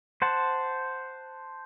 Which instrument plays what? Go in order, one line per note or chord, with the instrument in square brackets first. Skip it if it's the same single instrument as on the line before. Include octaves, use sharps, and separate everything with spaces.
[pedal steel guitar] C5 F#5 A5